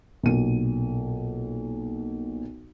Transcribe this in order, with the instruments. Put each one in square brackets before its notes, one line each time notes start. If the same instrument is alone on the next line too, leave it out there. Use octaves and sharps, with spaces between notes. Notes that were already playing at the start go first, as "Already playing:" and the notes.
[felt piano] B1 A#2 D#7